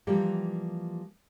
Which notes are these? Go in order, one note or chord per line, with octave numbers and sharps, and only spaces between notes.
E3 F3 G3 A#3 G4